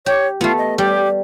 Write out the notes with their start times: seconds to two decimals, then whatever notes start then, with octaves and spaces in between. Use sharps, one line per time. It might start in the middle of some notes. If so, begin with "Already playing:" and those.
0.06 G4 C#5
0.41 A3 B3 F4
0.58 D#5
0.78 G3 G4